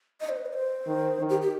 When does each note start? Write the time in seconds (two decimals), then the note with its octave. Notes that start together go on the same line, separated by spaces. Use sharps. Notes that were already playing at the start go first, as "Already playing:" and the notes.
0.21 D#5
0.29 C5
0.37 B4
0.46 D#5
0.53 C5
0.87 D#3
1.19 D#3
1.30 G4
1.42 G4